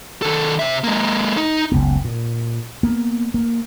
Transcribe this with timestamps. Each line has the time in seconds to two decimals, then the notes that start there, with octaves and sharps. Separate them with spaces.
0.22 D#3 A4
0.59 C3 E5
0.84 G#3 A#3
1.37 D#4
1.72 F#1 C#2 B3
2.05 A#2
2.83 A#3 B3
3.34 A#3